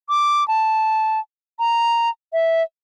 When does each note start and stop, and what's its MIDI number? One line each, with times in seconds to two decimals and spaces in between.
0.09 0.46 86
0.48 1.20 81
1.59 2.10 82
2.33 2.62 76